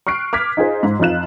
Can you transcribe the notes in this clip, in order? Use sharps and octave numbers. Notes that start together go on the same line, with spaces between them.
C#6 F6 F#6 C7 D7
D6 F6 G#6 B6
D#4 F4 G#4 C5
G#2
F2 D#4 F4 F#6 E7